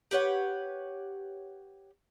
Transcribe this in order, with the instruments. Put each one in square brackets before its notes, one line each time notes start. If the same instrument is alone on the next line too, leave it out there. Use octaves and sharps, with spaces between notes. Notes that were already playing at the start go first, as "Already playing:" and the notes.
[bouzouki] G4 B4 C#5 F#5